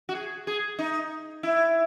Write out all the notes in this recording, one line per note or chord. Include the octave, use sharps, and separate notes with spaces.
F#4
G#4
G#4
D#4
E4